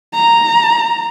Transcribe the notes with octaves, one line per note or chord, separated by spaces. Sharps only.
A#5